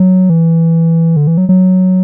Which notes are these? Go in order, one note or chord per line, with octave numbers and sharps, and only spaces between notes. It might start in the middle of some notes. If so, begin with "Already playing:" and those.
Already playing: F#3
E3
D3
E3
F#3
F#3